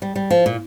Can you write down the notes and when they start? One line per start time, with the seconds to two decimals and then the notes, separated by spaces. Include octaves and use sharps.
0.02 G3
0.16 G3
0.30 F3
0.46 A#2